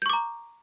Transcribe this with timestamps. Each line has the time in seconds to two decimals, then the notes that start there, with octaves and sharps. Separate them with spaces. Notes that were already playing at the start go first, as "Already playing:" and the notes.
0.02 G6
0.06 C#6
0.10 D6
0.13 A#5